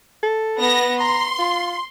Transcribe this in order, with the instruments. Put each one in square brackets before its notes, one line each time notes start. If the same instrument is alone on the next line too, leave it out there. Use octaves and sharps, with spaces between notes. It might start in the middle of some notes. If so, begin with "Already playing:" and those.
[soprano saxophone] A4
[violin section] B3 A#6
[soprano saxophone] A#5 [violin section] C6
[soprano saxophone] F4